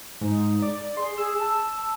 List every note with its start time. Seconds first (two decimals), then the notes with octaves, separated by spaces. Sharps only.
0.21 G#2 D#4
0.62 D5
0.97 G#4 C6
1.17 G#4 E6
1.39 A5